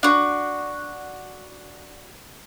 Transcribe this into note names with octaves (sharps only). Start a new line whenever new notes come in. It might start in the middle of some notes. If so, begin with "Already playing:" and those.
D4 F#4